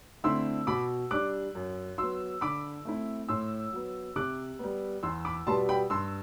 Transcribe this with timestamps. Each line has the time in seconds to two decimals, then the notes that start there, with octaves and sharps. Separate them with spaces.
0.24 D3 A3 C4 E4 C6 E6
0.67 B2 B5 D6
1.11 G3 D4 D6 F#6
1.55 F#2
1.98 F#3 B3 C6 E6
2.41 D3 B5 D6
2.85 A3 C4 E4
3.29 A2 C6 E6
3.73 F#3 B3
4.16 C3 D6 F#6
4.59 G3 B3
5.03 E2 C6 E6
5.25 B5 D6
5.47 B2 G3 B3 A5 C6
5.69 G5 B5
5.90 G2 C6 E6